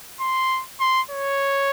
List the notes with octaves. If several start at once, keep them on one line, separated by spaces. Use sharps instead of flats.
C6
C6
C#5